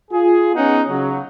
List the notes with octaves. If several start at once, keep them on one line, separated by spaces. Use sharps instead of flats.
F4 G#4
B3 C#4 D#4 G#4 F#5
C#3 F#3